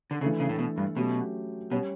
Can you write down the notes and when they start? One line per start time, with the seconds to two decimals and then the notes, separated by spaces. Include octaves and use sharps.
0.11 D3
0.21 C#3 E3 A3 D4 A4
0.40 C#3
0.49 A2
0.59 B2
0.77 G2
0.96 B2 F#3 A3 C#4 G4
1.71 B2 G3 C#4 G4 C#5